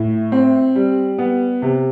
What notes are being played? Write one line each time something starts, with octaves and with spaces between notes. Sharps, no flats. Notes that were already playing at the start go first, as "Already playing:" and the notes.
Already playing: A2
C4
G3
B3
C3